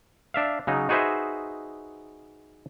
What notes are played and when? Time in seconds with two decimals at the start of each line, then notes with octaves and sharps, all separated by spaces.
0.34 D4 E5 F5
0.67 C#3 F#3 D#4
0.89 D#4 F#4 G#4 B4 C5 E5